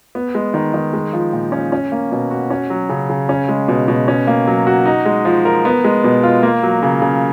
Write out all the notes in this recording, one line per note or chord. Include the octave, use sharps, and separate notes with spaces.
B3
G#3
D#3
D#3
G#3
F3
A#2
C#4
C#4
A#3
B2
F#4
C#4
F#3
C#3
C#3
C#4
G#3
B2
B2
C#4
A#3
F#3
F#4
D#4
G#3
F3
A#4
B3
G#3
B2
F4
A#3
F#3
C#3
C#3